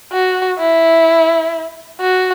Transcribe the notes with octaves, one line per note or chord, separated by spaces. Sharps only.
F#4
E4
F#4